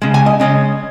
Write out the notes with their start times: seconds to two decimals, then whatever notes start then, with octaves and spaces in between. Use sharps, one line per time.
0.02 C#3 G#3
0.14 G#5
0.26 D#5
0.40 C#3 G#3 C#4 D#5